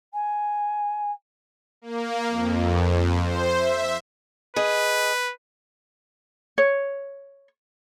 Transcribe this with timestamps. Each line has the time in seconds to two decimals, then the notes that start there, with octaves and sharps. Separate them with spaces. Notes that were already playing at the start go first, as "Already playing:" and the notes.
0.13 G#5
1.82 A#3
2.29 F2
3.20 C5
3.56 E5
4.56 G#4 B4 D#5
6.58 C#5